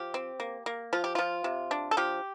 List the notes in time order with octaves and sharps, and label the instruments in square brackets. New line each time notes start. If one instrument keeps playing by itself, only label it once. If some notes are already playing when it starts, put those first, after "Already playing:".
Already playing: [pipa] F3 G4
C4
A#3
A#3
F3 F4
G4
F3 F4
C3
D4
A4
F3 G4